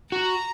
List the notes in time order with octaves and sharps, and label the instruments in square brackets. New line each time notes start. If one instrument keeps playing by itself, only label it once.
[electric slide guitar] F#4 [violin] A#5